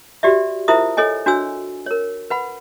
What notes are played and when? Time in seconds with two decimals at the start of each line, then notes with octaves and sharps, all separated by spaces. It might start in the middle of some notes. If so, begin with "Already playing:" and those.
0.23 F#4 G4 D5 E5
0.68 E4 F4 A#4 C5 E5 D#6
0.97 A4 C#5 D#5 G#5
1.26 D4 F#4 C#5 G#5 E6
1.86 A#4 C#5
2.30 B4 F#5 B5